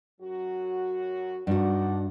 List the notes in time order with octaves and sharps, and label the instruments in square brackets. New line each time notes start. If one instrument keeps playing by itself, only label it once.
[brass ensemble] F#2 F#3 F#4
[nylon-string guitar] G2 F#4 [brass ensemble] D4 D#4 F#5